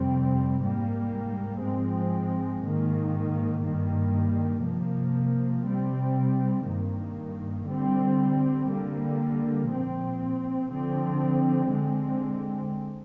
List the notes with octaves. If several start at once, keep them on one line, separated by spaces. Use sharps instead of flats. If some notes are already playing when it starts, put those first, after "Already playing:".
Already playing: F2 C3 G3 C4
G#2 G3 A#3
G#2 F3 G#3 C4
G#2 D#3 A#3
G2 D#3 G3 A#3
C3 F3 A#3
C3 G3 C4
G2 D#3 A#3
D3 G3 C4
D3 G3 A#3
A#2 F3 C4
D3 F3 C4
D3 G#3 C4